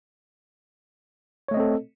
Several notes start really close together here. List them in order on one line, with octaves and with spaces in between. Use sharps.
C#5 A3 D#5 C4 A4